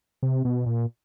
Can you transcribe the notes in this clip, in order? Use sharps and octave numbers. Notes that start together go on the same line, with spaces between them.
C3
B2
A#2